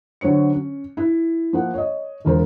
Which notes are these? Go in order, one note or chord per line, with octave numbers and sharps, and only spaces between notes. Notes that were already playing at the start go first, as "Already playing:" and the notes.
D3 F#3 C5 C#5 C#7
C#4
E4
F3 A#3 F#5
C#5 D#5
E1 F4 A#4 C5